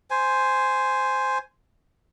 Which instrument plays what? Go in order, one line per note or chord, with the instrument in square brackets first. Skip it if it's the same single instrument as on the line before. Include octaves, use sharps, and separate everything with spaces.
[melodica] C5 G#5